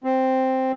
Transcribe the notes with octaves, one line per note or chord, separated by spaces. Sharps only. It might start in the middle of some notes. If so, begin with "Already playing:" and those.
C4